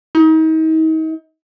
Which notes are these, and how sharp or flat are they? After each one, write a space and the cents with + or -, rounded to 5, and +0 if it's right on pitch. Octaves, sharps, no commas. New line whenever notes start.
D#4 +35